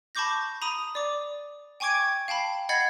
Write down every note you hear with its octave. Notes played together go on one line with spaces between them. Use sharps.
A5 B5 C#6 D6 G6 A#6
A#5 B5 D#6 D#7
D5 D6
G5 G#5 C#6 D6 G#6 D7
F5 G5 A5 B5
D#5 F#5 B5 G#6 A6 C7